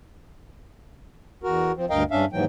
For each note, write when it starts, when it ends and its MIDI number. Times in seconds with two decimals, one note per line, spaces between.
1.44 1.72 40
1.44 1.72 66
1.44 1.72 70
1.77 1.85 53
1.77 1.85 60
1.90 2.03 38
1.90 2.03 43
1.90 2.03 70
1.90 2.03 75
1.90 2.03 77
1.90 2.03 79
2.11 2.25 43
2.11 2.25 61
2.11 2.25 62
2.11 2.25 76
2.11 2.25 77
2.33 2.45 39
2.33 2.45 44
2.33 2.45 52
2.33 2.45 54
2.33 2.45 79